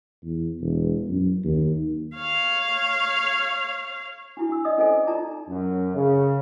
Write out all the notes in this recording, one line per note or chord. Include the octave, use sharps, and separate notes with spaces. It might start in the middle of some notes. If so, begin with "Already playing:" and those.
E2
E1
F#2
D#2
C#5 F5
D4 E4 F#4
D4 E6
D5 D#5 D#6
C#4 A4 C5 D#5 G#5
D6
D#4 F4 D5 A5 A#5
F#2
C#3